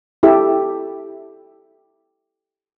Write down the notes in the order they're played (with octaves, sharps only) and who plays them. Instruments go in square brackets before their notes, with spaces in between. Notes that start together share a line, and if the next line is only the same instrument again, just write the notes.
[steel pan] E4 G4 A4 E5